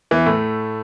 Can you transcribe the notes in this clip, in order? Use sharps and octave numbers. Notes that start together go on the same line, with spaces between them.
E2 E3
A2 A3